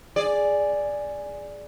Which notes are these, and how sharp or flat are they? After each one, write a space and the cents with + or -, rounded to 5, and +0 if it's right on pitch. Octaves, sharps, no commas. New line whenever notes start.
G#4 +0 D5 +0